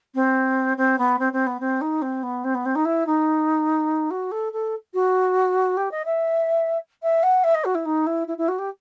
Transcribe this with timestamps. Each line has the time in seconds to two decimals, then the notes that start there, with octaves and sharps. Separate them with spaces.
0.14 C4
0.77 C4
0.98 B3
1.19 C4
1.32 C4
1.46 B3
1.60 C4
1.81 D#4
2.02 C4
2.23 B3
2.44 C4
2.54 B3
2.65 C4
2.75 D#4
2.85 E4
3.06 D#4
4.10 F#4
4.31 A4
4.52 A4
4.94 F#4
5.77 G4
5.91 D#5
6.05 E5
7.02 E5
7.23 F#5
7.44 E5
7.54 D#5
7.64 F#4
7.74 E4
7.85 D#4
8.06 E4
8.27 E4
8.38 E4
8.48 F#4
8.58 G4